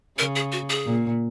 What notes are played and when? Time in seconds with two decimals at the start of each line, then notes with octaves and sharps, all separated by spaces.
0.18 C#3 A#4
0.36 G#4
0.52 F#4
0.70 G#4
0.86 A#2